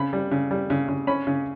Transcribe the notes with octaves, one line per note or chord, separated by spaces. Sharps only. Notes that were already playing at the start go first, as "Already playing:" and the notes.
Already playing: C#3 B5
G3
C#3
G3
C#3
C#3
C#4 B5
C#3